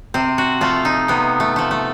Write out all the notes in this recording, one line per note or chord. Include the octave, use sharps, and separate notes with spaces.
C3 C4
F#4
F3 A3 F4
D#4
C3 B3
A3
F3 A3
A3